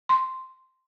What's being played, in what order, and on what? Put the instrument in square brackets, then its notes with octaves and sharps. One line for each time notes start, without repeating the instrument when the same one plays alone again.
[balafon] C6